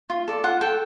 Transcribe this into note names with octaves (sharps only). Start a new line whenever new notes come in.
F4
A4 D5
F4 F#5
A4 D5 G5